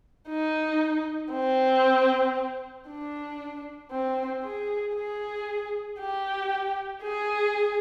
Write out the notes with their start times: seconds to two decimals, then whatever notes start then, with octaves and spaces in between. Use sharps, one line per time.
0.29 D#4
1.33 C4
2.89 D4
3.91 C4
4.44 G#4
4.96 G#4
6.00 G4
7.03 G#4